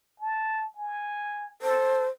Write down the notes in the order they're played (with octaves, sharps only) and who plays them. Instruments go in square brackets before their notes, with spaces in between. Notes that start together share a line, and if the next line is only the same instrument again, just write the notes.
[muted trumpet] A5
G#5
[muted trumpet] A4 [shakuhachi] C5